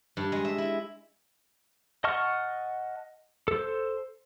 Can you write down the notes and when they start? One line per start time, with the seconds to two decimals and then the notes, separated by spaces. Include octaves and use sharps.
0.17 G2
0.32 G#3
0.44 E5
0.58 E4
2.04 D#5 F#5 A5 C#6 F6
3.48 A4 C5